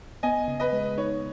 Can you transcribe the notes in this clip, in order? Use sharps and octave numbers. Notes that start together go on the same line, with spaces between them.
B3 D#5 G#5
C#3
B4 D#5
G#3
D#4 C#5